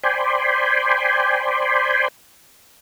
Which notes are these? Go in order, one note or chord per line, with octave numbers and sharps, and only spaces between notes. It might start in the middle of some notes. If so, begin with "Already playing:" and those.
C5 D5 G5 G#5 B5 C6